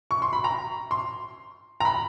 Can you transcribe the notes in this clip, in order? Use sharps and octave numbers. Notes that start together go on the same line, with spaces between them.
C#6
C6
B5
A#5
C6
A#5
B5